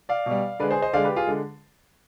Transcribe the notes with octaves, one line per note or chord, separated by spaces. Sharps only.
D5 F5
B2
G3
D3 G#3 B4 D5
G#4 C5
C5 D#5
D3 G#3 D5 F5
G4 B4
F4 G#4
D3 G#3